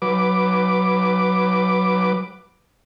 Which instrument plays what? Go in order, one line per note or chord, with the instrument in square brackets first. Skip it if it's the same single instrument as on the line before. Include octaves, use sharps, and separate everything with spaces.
[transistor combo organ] F#3 B4 D6